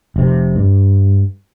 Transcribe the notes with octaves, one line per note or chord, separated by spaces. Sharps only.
F1 C3
G2